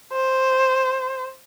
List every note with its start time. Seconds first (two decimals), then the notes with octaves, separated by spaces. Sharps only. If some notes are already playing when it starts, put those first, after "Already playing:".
0.13 C5